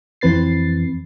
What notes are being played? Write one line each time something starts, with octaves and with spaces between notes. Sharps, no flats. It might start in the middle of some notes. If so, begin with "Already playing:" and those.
F2 E3 C4 B4 A6 C7